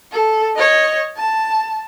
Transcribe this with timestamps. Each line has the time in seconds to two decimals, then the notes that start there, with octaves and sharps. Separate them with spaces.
0.12 A4
0.55 C#5 D#5
1.16 A5